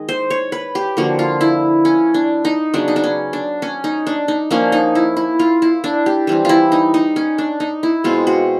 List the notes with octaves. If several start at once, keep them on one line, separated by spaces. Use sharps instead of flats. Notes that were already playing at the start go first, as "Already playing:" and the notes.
Already playing: D#3 G#3 D#5
C5
C#5
B4
G4
D3 F3 A#3 F#4
F4
E4
C#4
D4
D#4
C#3 F#3 B3 D4
D#4
D4
C#4
D4
C#4
D#4
D4
D#4
F3 A#3 C#4 D4
D#4
E4
E4
F4
E4
D4
G4
E3 G3 C4
E4 F4
D#4
D#4
C#4
D4
D#4
E4
B2 G#3 C4 F4
F#4